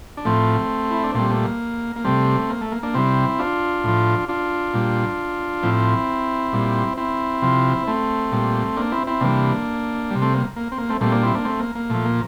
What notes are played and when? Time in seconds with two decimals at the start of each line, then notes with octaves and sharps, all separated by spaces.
0.17 D4
0.25 A2 F3 A3 C4
0.91 E4
1.03 D4
1.15 A#2 G3 A3 C4
1.30 A3
1.45 A#3
1.96 A#3
2.04 C3 G3 A3 C4
2.50 A#3
2.61 A3
2.72 A#3
2.83 A#3 D4
2.94 C3 G3 C4 E4
3.39 D4 F4
3.84 A2 F3
4.29 D4 F4
4.74 A#2 G3
5.63 A2 F3 C4 E4
6.53 A#2 G3
6.97 C4 E4
7.42 C3 F3
7.87 A3 C4
8.32 A#2 G3
8.77 A#3 D4
8.92 C4 E4
9.07 C4 E4
9.21 C3 E3 G3 A#3 D4
10.11 C3 G3
10.22 A3 C4
10.34 A#3
10.56 A#3
10.72 C4
10.78 A#3
10.89 A3 C4
11.01 A#2 G3 A3 C4
11.12 A#3 D4
11.23 C4 E4
11.34 A#3 D4
11.45 A3 C4
11.60 A#3
11.75 A#3
11.90 A#2 F3 A3
12.05 A#3